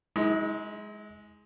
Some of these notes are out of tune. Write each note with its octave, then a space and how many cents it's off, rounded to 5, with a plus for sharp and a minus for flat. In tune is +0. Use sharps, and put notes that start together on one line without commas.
G#3 +10 E4 -45